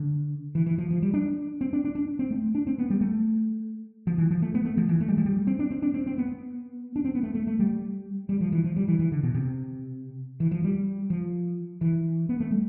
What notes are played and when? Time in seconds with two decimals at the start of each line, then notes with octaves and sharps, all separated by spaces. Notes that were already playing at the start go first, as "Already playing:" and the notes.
Already playing: D3
0.55 E3
0.66 E3
0.78 F3
0.91 F3
1.03 G3
1.14 D4
1.61 C4
1.73 D4
1.85 D4
1.95 D4
2.19 C4
2.31 A3
2.55 D4
2.67 C4
2.78 B3
2.90 G3
3.01 A3
4.07 F3
4.18 E3
4.30 F3
4.42 A3
4.54 B3
4.65 A3
4.77 F3
4.89 E3
5.01 A3
5.08 G3
5.17 F3
5.25 G3
5.47 C4
5.59 D4
5.71 C4
5.82 D4
5.94 C4
6.07 C4
6.18 B3
6.96 D4
7.05 C4
7.15 B3
7.23 A3
7.35 A3
7.47 A3
7.59 G3
8.29 G3
8.41 F3
8.53 E3
8.64 F3
8.77 G3
8.88 E3
8.99 E3
9.12 D3
9.24 B2
9.35 C3
10.40 E3
10.51 F3
10.64 G3
11.10 F3
11.81 E3
12.29 B3
12.40 A3
12.51 G3